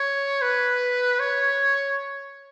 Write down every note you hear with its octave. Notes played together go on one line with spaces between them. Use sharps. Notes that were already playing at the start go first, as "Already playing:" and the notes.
Already playing: C#5
B4
C#5